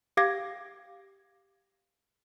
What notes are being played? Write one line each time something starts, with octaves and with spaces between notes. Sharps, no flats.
G4 F5 D6 G#6 A#6